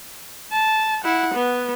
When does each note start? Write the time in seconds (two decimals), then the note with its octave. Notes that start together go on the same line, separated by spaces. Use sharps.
0.52 A5
1.04 E4 F#5
1.35 B3